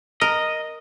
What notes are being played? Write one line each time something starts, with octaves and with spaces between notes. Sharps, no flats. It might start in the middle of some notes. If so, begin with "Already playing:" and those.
A#4 D#5